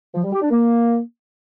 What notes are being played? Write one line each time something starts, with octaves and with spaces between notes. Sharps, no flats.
F3
G3
G4
D4
A#3